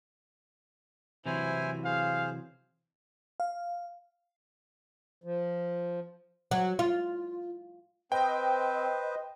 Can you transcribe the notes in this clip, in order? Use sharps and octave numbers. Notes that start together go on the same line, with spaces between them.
C3 E3 F#3 E4 C5 G#5
G#4 C5 F5
F5
F3
F#3
F4
C4 B4 C5 D#5 G5